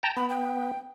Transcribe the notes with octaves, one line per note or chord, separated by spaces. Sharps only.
G5 A5 A#5
B3 B5
G5